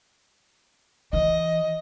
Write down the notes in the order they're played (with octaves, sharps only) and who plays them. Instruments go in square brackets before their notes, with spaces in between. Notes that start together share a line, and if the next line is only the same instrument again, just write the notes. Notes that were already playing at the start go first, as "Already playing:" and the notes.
[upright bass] E3 [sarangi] D#5